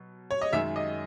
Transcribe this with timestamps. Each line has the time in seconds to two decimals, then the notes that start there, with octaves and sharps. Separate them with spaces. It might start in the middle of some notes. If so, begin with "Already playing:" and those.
Already playing: B2 F#3
0.31 C#5
0.42 D#5
0.53 F#2 D#3 G#3 E5
0.76 D#5